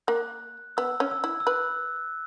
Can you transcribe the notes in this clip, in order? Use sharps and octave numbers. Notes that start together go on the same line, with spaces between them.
A#3 F#6
B3 E6
C#4
E6
E4
E6
B4 F#6